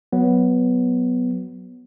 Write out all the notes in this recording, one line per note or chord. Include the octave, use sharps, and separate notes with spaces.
F#3 B3